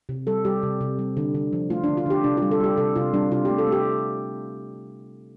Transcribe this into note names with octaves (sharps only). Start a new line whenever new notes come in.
C3
G3 A4
G3 G4
C3
C3
G3
D3
D3
F3
A3 F4
D3 D4
F4
D3 G4
C3 D4
G3 F4
A4
G3 G4
C3 A4
C3 F4
G3 D4
C3 F4
A3 G4
A4
A3 G4